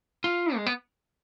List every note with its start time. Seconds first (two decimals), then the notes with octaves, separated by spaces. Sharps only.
0.24 F4
0.55 G#3
0.66 B3